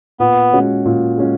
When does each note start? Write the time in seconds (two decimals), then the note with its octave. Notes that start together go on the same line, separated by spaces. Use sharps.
0.20 A#2 B3
0.53 G#3 C#4 F#4
0.85 A#2
1.18 G#3 C#4 F#4